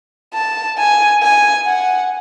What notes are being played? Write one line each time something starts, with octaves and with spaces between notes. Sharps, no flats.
A5
G#5
G#5
F#5